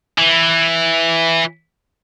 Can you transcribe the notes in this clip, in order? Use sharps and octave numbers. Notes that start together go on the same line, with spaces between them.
E3